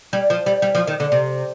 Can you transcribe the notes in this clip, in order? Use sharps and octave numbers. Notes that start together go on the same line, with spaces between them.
G3
F3
G3
G3
F3
D#3
D3
C3